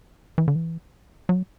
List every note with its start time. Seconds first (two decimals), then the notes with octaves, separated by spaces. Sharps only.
0.38 E3
0.48 D3
0.56 E3
1.29 F#3